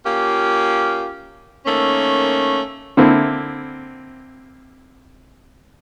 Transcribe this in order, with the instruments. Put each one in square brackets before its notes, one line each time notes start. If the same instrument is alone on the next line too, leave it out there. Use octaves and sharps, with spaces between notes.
[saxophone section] A#3 C#4 F4 G4
D#3 A3 A#3 C#4
[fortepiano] D3 A#3 C4 E4